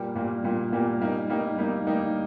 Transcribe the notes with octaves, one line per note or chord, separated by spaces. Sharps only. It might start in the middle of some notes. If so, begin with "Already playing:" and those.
Already playing: A#2 G3 A#3
A#2 G3 A#3
A#2 G3 A#3
A#2 G3 A#3
G3 A#3 D#4
G3 A#3 D#4
G3 A#3 D#4
G3 A#3 D#4